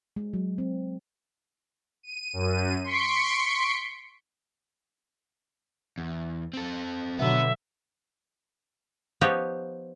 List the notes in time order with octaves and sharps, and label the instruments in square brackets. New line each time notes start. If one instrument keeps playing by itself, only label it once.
[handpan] G#3
F#3
C4
[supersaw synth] D#7
F#2 D#7
C6 C#6 B6 C#7 D7
[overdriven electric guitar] E2
C4 A4
[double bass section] B2 D3 F#3 [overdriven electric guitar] B3 B4 [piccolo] E5
[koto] F3 B3 D#4 G4 C#5